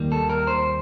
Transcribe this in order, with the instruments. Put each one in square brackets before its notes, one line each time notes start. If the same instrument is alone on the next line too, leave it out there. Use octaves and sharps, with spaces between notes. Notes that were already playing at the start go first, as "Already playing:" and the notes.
Already playing: [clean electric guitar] D#2 D#3 G3 A#3
A4
A#4
C5